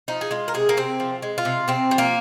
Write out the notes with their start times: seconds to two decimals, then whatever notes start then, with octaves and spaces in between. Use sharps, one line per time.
0.08 F3 D#4
0.21 G#4
0.31 G#3 F4
0.48 A#4
0.54 C3 G#4
0.69 A#3
0.77 C3 C4
1.00 F3
1.22 G#3
1.38 F4
1.45 C3
1.68 C3 C4
1.91 F3
1.98 A#3